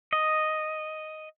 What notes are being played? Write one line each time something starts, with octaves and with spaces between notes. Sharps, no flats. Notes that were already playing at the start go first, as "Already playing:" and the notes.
D#5